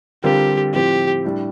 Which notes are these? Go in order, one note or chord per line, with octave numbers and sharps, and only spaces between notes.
D3 G3 C4 F4 G4 A#4
A2 F3 C4 G4
A2 G3 D4